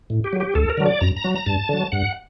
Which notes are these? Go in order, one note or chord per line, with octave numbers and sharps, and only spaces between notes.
A2
G4
F#3
G4
D2 A4
A#4
D3 F#3
D5
F#2 A#5
A#5
F#3
A#5
G2 A5
D3 F#3
G2 F#5